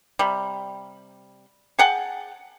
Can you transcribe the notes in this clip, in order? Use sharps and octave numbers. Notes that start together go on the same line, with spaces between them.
C3 G3
G#4 F#5 G5 A5